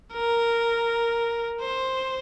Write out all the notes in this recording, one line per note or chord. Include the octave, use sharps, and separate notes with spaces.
A#4
C5